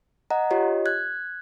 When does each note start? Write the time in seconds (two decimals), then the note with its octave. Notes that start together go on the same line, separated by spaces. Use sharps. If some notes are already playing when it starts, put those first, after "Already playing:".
0.30 D#5 F#5 A#5
0.51 F4 G4 C#5 D#5
0.86 F#6 G#6